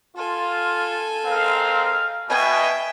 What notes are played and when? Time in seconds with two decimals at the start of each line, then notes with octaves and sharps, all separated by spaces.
0.16 F4 A4 G#5
1.26 G#3 C4 A#4 F5
2.29 B2 E5 G5 G#5